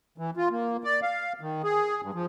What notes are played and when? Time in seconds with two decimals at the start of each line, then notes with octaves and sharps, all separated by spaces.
0.18 E3
0.37 F4
0.51 A#3
0.84 D5
1.02 F5
1.41 D#3
1.63 G#4
2.02 G2
2.14 F3